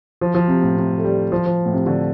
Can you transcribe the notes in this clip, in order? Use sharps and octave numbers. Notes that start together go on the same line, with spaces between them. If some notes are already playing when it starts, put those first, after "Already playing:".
F3
F3
C3
A2
C3
A3
G3
F3
F3
A2
C3
D3